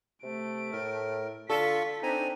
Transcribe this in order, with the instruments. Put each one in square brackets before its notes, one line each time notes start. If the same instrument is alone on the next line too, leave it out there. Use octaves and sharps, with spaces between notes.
[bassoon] C3 [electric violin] A3 D7
[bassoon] A2 [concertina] A#4
[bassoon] D3 [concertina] F4 C#6 [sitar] A4 [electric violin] B6
[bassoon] C4 [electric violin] D4 D#4 [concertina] G#5 A#5